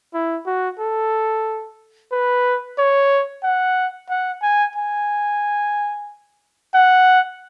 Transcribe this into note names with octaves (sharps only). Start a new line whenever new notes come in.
E4
F#4
A4
B4
C#5
F#5
F#5
G#5
G#5
F#5